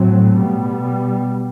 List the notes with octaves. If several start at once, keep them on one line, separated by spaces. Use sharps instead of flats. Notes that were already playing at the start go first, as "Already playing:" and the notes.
Already playing: A2 F#3 A3 C4
B2 G3 B3